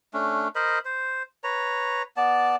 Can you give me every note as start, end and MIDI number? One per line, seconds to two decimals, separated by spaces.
0.14 0.48 57
0.14 0.48 61
0.14 0.48 62
0.55 0.79 70
0.55 0.79 72
0.55 0.79 75
0.55 0.79 83
0.85 1.23 72
1.44 2.02 71
1.44 2.02 73
1.44 2.02 82
2.17 2.56 59
2.17 2.56 74
2.17 2.56 81